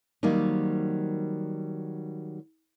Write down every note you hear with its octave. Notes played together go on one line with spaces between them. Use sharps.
D#3 F#3 G3 A#3 C4 D#4